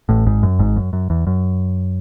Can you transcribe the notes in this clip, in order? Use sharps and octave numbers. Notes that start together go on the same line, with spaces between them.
A1 A2
G#1 G#2
F#2
G#1 G#2
F#2
F#2
E2
F#2